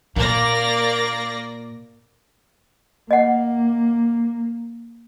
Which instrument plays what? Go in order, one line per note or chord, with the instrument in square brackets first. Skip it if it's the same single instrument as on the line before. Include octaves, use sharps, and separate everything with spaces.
[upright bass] A#2 [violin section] A#3 D5 A#6
[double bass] A#3 [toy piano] D#5 F#5